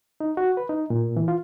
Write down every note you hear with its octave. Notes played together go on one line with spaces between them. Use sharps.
D#4
F#4
B4
D#4
A#2
E3
F4